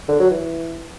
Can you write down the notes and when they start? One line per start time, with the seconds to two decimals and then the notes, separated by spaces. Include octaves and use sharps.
0.08 D3
0.20 F#3
0.31 E3